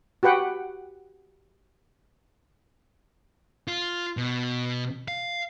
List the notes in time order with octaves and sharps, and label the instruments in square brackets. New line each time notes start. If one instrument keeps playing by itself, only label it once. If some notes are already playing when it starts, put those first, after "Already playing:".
[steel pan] F#4 G4 B4 F#5 G5
[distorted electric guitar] F4
B2
F5